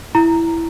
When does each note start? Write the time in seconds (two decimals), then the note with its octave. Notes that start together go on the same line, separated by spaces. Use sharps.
0.15 E4 A#5